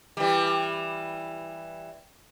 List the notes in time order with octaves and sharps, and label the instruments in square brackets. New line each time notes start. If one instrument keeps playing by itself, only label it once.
[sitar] E3 G3